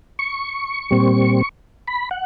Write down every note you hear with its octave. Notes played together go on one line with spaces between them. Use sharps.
C#6
A#2 G3 C4
B5
F#5